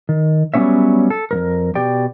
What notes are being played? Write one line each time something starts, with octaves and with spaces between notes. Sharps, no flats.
D#3
F#3 G3 B3 C#4 C#5 E5
A4
F2 G#2 A#4
B2 G4 D5 G5